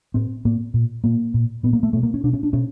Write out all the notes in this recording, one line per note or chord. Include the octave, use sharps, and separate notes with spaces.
A2 C4
A2 A#3
A#2
A#2 A#3
A#2
A#2 B3
A#3
A3
B2 A3
A#3
C#4
B2 D4
C#4
D4
B2 C#4